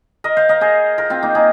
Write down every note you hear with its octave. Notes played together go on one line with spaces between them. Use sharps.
A#4 D#5
C5 F5
A#4 D#5
G#4 C5
F4 A#4
C4 F4
A#3 D#4
D#4 G#4